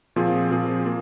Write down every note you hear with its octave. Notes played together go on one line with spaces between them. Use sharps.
A#2 F3 C4 F4 G#4
A#2 F3 C4 F4 G#4
A#3 F4